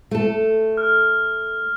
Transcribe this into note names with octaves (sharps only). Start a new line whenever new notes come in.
A3 A4
F6